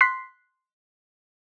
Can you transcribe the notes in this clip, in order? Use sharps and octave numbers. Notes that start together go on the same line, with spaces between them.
C6 F#6 B6 C7